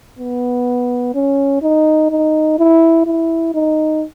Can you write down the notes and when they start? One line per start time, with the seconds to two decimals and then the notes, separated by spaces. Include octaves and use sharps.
0.19 B3
1.14 C#4
1.62 D#4
2.11 D#4
2.59 E4
3.06 E4
3.54 D#4